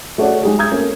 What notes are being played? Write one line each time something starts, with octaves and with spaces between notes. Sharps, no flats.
A3 F#4 G#4 C#5 D5 F#5
G#3 D#4 G4 G#4
A#5 D#6 G6 G#6
A3 A#3 C4 C#4